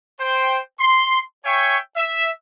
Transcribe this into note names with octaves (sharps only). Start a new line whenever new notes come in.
C5 G5
C6
C#5 E5 G5 G#5 C#6
E5